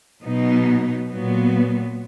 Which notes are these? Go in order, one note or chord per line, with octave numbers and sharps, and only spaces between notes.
B2 F#3 B3 D#4
A#2 F#3 B3